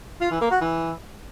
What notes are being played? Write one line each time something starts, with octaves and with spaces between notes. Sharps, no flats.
F4
E3
A#3
F#4
E3